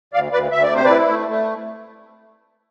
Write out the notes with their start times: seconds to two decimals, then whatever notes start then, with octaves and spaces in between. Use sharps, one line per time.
0.13 D2 D5 F5
0.32 D2 B4 D5
0.52 D2 E5
0.63 D5
0.70 C3 C5
0.85 E4 B4 D5
1.09 A3
1.28 A3